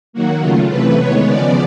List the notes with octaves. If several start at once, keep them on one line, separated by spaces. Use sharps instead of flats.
D#3 F#3 A#3 F#4
C#3 F#3 A3 F4
C3 E3 A3 B4
D#3 G#3 B3 C#5
C#3 F3 G#3 B3 D5